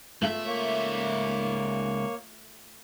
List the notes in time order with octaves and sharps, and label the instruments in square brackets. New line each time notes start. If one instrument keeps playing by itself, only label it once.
[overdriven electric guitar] C#2 E5 [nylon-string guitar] A3 F4
[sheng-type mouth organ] A#3 C#5